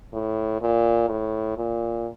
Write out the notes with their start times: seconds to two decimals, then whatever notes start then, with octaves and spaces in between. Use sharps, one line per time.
0.13 A2
0.61 A#2
1.09 A2
1.57 A#2